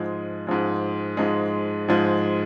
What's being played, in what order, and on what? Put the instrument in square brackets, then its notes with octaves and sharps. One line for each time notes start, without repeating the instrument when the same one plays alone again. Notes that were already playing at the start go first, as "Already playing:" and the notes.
Already playing: [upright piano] G#2 F3 G#3
G#2 F3 G#3
G#2 F3 G#3
G#2 F3 G#3